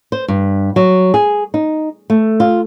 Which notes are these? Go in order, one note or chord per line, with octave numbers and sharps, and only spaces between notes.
C5
G2
F#3
G#4
D#4
A3
F4